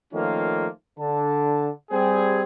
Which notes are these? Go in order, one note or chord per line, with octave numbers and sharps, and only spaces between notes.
D#3 F3 A3 A#3 C#4 F4
D3 A5
G3 C4 G#4